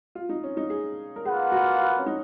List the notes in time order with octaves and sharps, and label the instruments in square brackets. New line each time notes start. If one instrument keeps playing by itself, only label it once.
[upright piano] F4
D#4
C#4
D#4
G#4
A#4
[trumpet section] A#3 F4 B4 F#5 [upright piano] G#4
[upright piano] F#4
F#4
C#4
D#4